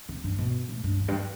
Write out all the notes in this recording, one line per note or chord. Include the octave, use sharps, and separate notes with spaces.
C3
G2
B2
A2
G2
E2
G2